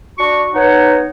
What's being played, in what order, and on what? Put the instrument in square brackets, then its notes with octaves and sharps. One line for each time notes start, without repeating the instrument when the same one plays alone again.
[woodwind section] D4 F#4 C#6
B3 D#4 C#5 F#5